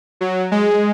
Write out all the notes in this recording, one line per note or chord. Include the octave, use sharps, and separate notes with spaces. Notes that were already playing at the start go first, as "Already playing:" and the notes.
F#3
G#3